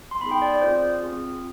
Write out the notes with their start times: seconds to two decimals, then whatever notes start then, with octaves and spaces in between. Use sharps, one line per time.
0.11 C6
0.21 B3 D#4 G#4 B5
0.31 G5
0.42 D5
0.52 D5
0.62 C4 F4 G#4 C5
1.02 C4 F4 G#4